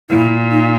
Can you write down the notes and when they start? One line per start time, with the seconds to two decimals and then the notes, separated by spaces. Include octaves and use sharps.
0.10 A#2 E4
0.51 D#4